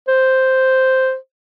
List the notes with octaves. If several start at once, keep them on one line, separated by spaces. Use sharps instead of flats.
C5